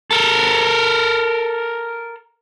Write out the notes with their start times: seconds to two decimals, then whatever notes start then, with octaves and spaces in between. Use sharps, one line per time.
0.11 A4 A#4